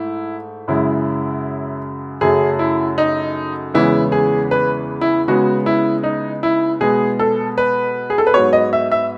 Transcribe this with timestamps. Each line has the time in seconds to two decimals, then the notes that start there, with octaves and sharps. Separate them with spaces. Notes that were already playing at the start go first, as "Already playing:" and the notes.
Already playing: G#2 A3 E4
0.68 F#2 C#3 G#3 E4
2.21 F#2 C#3 F#3 A3 G#4
2.59 E4
2.98 D#4
3.74 E2 C#3 E3 G#3 B3 E4
4.12 G#4
4.51 B4
5.01 E4
5.28 C#3 G#3 B3 F#4
5.66 E4
6.04 D#4
6.43 E4
6.80 B2 G#3 B3 G#4
7.19 A4
7.58 B4
8.10 G#4
8.18 A4
8.27 B4
8.34 G#2 F#3 B3 C#5
8.53 D#5
8.73 E5
8.92 E5